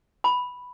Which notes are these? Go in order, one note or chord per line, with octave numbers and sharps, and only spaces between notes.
B5